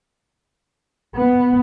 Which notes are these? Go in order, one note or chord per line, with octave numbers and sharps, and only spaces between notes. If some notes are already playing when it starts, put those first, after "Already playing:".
B3